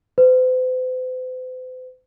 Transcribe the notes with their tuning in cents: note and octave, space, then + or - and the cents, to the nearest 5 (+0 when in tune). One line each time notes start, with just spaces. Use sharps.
C5 -45